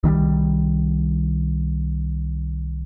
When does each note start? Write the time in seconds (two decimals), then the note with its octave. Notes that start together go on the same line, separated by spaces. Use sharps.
0.03 C2 D#3 F3 G3